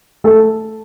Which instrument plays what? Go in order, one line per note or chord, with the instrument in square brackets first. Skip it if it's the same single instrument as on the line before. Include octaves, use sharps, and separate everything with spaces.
[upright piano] A3 A4